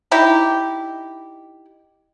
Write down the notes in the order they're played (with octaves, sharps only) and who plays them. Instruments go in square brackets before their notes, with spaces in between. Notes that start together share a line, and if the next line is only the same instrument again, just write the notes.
[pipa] D#4 E4 G4